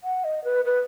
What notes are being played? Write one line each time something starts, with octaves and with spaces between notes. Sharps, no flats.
F#5
D#5
B4
B4